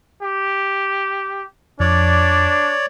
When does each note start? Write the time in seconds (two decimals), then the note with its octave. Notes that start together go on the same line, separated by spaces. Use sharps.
0.23 G4
1.80 F2 D4 C#5 D5